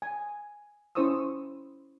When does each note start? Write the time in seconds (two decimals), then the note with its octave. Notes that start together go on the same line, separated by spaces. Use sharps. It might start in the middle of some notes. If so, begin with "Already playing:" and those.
0.02 G#5
0.95 C#4 E4 C5 C#6 D#6 E6